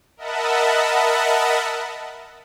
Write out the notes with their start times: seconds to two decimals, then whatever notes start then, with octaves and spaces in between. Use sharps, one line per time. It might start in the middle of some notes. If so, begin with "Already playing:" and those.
0.17 A#4 D#5 E5 F#5 A5 B5